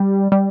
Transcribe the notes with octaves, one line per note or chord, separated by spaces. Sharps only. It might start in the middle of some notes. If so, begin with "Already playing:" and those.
Already playing: G3
G3